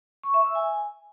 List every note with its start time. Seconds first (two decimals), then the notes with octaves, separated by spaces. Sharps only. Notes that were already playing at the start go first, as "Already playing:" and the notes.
0.24 C#6
0.34 E5
0.45 E6
0.55 G#5